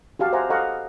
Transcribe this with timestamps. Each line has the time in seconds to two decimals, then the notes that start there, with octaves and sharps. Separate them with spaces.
0.19 F#4 G4 F5 A5
0.32 C5 D#5 E5 F#5 G#5 A#5
0.50 A4 D#5 F5 F#5 A#5 C#6